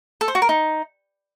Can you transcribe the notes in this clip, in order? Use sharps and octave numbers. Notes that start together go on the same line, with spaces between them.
A4
C5
F#4
A#4
D#4